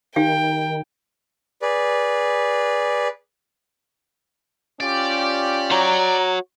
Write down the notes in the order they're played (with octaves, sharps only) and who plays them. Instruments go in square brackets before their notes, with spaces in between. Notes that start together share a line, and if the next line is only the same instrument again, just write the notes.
[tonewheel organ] D#3 [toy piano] D#4 G4 F5 [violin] G5
[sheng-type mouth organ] G#4 B4 D5
[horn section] C#4 F4 G4 [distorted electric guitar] D5
[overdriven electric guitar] F#4 C#5 [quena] A#5